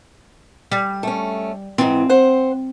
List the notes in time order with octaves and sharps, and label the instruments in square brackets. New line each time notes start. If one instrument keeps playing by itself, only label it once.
[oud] G3
[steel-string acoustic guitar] A3 C#4
[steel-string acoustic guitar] G#2 E3 [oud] C4
[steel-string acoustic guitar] C5 F#5